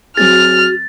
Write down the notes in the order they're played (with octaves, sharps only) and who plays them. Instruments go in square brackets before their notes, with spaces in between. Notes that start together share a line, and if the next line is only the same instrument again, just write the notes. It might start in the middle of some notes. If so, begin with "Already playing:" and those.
[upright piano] F#3 C4 G#4 [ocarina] F#4 [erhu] F6 [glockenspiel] A6